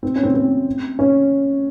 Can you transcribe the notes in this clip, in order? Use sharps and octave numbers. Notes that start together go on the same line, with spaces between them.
C4
C#4
C4
C4
C#4